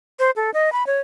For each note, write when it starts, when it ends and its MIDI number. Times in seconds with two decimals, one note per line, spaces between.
0.19 0.31 72
0.36 0.50 69
0.54 0.72 75
0.73 0.86 83
0.87 1.01 73